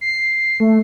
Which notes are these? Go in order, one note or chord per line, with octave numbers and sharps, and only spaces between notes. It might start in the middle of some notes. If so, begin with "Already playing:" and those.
C7
A3